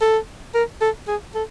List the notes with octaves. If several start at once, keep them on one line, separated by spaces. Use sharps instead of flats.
A4
A#4
A4
G#4
A4